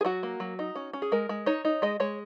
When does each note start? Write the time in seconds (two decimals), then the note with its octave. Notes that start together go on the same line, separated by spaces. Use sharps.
0.01 G#4
0.05 F#3 F#4
0.23 A#3
0.40 F#3
0.59 D#4
0.76 C#4
0.93 C#4
1.02 G#4
1.12 G#3 A#4
1.29 G#3
1.46 D#4 C#5
1.65 D#4
1.82 G#3 D#5
2.00 G#3 C#5